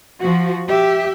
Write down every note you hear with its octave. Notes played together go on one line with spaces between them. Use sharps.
F3 F#4
G4 E5